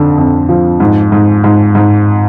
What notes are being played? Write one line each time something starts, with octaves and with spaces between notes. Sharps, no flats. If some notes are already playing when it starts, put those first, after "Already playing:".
Already playing: F2 D3
F2
F3
G#2
G#2
G#2
G#2